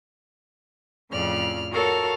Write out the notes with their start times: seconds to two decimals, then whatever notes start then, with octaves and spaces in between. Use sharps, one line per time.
1.11 F2 A2 C#3 D5 F6
1.71 F#4 A4 A#4 C#5 F5